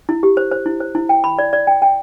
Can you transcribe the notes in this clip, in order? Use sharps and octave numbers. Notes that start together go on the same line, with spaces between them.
E4
G4
C5
C5
E4
C5
E4
G5
B5
D5
D5
G5
G5